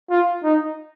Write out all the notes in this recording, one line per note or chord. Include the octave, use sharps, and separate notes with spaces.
F4
D#4